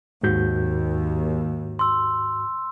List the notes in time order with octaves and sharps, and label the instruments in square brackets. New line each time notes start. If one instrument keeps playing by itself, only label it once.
[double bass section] D#2 [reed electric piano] G#2 F#4 G6
[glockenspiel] C6 E6